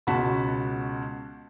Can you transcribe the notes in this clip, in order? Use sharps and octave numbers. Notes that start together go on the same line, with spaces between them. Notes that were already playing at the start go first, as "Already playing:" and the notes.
C#2 B2 F#4 A5 B6